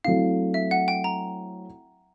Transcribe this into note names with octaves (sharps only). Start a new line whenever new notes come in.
F#3 A3 C4 E4 F5
E5
F#5
G5
A#5